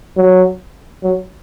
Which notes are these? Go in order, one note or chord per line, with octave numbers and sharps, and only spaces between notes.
F#3
F#3